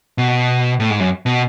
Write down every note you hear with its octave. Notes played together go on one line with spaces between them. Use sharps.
B2
A2
G#2
F#2
B2